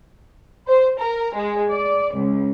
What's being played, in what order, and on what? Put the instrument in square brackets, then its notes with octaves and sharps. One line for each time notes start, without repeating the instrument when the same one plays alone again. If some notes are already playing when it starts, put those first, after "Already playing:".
[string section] C5
A#4
G#3
D5
C#2